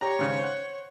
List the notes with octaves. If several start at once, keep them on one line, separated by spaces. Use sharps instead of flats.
G4 C#5 A#5
G#2 C#3 C#4
C5 F#5